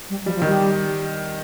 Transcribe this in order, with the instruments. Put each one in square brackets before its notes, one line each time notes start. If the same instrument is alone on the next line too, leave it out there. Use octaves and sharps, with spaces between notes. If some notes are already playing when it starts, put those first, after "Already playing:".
[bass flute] G3
[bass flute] F3 [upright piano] G3
[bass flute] F3
[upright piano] D#3
[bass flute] G3